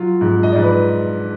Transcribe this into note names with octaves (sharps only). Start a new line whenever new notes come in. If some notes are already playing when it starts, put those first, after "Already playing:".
Already playing: F#3 F4
G#2
D#5
G#2 D5
B4